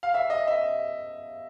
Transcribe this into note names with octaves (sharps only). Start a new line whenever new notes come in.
F5
E5
D#5
E5